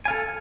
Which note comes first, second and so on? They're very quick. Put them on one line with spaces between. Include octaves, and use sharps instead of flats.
G#5 F5 A4